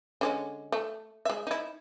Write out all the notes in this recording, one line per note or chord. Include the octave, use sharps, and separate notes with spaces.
D3 G#3 C#4
A3
G#3 E5
D#4 E4